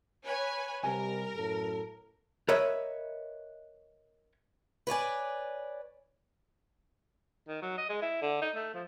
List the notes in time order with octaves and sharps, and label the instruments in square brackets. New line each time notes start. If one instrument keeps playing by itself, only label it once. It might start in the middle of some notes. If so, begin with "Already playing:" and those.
[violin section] B4 C#5 G#5
[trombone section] C3 G3 [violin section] A#4 [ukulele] G#5
[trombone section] F#2 A2 A4
[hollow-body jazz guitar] A#4 B4 C#5 D#5 E5
[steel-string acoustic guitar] B4 C#5 D5 G#5
[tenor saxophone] D#3
F#3
D#5
G#3
E4
D3
D#4
A3
F3